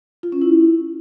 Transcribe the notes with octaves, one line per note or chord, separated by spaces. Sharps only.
F4
C#4
E4